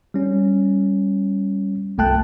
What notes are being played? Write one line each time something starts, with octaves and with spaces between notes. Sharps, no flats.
G3 C#4
G1 C2 A3 G5 A5 F#6